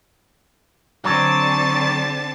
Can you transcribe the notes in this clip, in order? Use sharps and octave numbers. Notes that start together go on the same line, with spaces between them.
D3 F#3 C4 A5